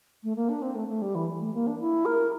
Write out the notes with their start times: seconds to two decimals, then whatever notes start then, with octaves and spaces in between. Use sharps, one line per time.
0.23 A3
0.36 A#3
0.49 D4
0.62 C4
0.75 A3
0.88 A3
1.01 G3
1.15 E3
1.40 A3
1.54 A#3
1.67 D4
1.80 E4
2.05 A#4